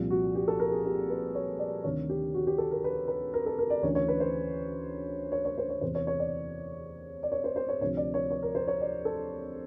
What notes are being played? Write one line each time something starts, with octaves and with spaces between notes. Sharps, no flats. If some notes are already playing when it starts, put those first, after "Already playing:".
Already playing: C2 A#2 F3
F#4
G4
A4
A#4
G#4
G4
B4
C#5
D5
D2 C3 D#3 C#5
G4
F#4
G4
A4
A#4
B4
B4
A#4
A4
A#4
D5
D2 C#3 E3 C#5
C#5
B4
C5
C#5
C#5
C5
C#5
E2 C3 E3 C5
C#5
C#5
D5
D5
C#5
C5
C5
C#5
D2 C3 F3 C#5
D5
C#5
C#5
A#4
C5
C#5
D5
A4